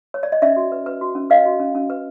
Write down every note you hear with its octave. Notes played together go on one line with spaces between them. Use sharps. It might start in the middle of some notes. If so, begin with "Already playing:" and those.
C#5
D5
D#5
C#4 D5 E5
F#4
B4
B4
F#4
C#4
B4 D#5 F5
F#4
C#4
C#4
B4